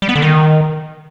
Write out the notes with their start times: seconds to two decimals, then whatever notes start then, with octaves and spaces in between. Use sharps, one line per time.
0.02 G3
0.09 B3
0.15 D3
0.22 D#3